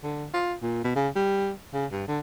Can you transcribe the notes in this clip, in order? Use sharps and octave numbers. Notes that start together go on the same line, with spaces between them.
D3
F4
A#2
B2
C#3
G3
C#3
G2
D3